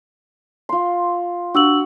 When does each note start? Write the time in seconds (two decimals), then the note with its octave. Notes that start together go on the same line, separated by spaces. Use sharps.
0.69 F4 C6
1.54 D4 F#4 E6 F#7